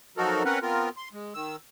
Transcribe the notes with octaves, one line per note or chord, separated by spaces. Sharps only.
F3 F#3 D#4 F#4 A4 A#4
C4 C#4 A#4 B4 F#5
B3 C4 F4 A#4
C6
G#3
D#3 E6